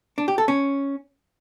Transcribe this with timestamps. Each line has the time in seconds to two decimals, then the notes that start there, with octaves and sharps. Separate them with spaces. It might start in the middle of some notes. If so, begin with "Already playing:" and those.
0.18 D4
0.28 G4
0.38 A4
0.48 C#4